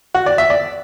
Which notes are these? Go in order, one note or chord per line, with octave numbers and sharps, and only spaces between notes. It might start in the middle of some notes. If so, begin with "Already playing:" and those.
F#4
D5
E5
D5